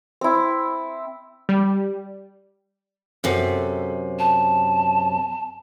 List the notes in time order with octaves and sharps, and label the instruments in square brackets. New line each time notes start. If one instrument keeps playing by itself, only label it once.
[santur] C4 E4
[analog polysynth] G3
[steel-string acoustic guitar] F#2 C3 [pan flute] A4
[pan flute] A5